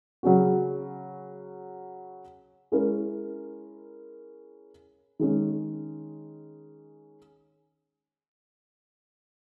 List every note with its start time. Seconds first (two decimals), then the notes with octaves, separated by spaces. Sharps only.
0.23 C#3 F#3 C#4 F#4
2.72 G#3 C#4 E4 A#4
5.19 D#3 G#3 C#4 G#4